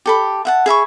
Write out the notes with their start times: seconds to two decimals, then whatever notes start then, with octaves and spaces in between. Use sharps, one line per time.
0.06 G4 A4 B5
0.45 E5 F#5 A5
0.66 G#4 E5 B5 C#6